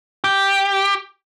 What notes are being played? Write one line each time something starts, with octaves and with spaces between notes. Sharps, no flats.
G4